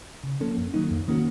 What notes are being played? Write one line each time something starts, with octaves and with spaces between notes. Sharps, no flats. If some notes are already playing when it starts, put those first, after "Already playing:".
C#3
F3 A#3 C#4 A4
F#2
D#3 F#3 A#3 D#4
F2
D#3 A#3 C#4 F#4